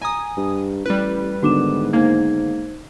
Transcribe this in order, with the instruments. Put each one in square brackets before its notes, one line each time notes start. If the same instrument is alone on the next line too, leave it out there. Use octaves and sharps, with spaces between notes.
[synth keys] G#5 D#6 [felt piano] A#5
[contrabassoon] G2
[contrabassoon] A1 [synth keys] G3 B4
[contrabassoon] G#2 [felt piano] D3 D#3 B3 [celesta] F#4 D6 E7
[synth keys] A#3 [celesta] D#4 C5 G#6